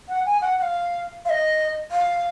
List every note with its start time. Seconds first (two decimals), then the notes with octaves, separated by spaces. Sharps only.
0.09 F#5
0.26 G#5
0.41 F#5
0.59 F#5
0.62 F5
1.25 F5
1.30 D#5
1.91 F5